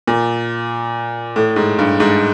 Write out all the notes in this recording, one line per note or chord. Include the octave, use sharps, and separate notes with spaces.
A#2
A2
G#2
G2
G#2